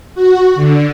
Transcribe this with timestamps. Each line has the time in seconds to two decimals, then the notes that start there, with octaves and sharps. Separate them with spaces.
0.15 F#4
0.55 D3